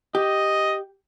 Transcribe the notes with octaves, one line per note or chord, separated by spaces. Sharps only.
G4 D#5